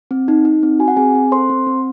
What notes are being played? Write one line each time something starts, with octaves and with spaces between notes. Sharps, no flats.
C4
D#4
D#4
C4
F#4 G#5
F#5
C4 G#4 G#5
C4
A4 C5 C6
C4
C4